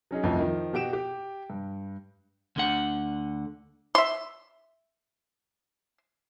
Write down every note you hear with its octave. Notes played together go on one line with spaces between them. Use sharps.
F#3 C#4 D#4 G#4
C2 F2 A2 E3 F3 D#4
D#3 F3
B2 F#4 G4 D7 E7
G4
G2
D2 D3 F#5
E5 C6